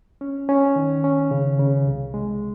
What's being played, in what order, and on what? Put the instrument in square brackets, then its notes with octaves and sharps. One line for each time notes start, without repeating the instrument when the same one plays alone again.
[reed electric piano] C#4
C#4
D#3
C#4
C#3
C#3
C2
G#3